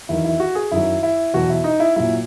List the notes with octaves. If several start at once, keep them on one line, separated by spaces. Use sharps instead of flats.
E2 D#3 F#3 E4
E4
F#4
G#4
F#2 D#3 F#3 E4
E4
E2 B2 F#3 F#4
E4
D#4
E4
A#2 F#3 E4